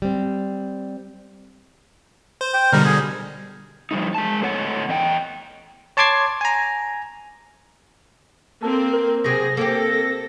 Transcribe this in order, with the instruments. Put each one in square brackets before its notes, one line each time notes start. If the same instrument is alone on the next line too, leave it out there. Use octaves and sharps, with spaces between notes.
[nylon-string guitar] G3 C4
[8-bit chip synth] C5
[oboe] G5
[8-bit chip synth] B2 D3 G3 [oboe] A#4
[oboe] G#4
[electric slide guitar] F3 G3 A3 D#4
G#3 A5
A2 A4 C#5 F#5
E2 D#5 G5
[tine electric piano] C#5 A5 C6 D6 G#6 C7
G#5 A#5
[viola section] A#3 C4 [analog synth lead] A4
[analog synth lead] A#4
[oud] C3 F#3 [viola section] G#4 [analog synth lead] A#6
[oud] A#3 C4 G4 [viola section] A4